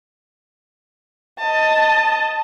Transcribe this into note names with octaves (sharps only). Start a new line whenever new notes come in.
D#5 A5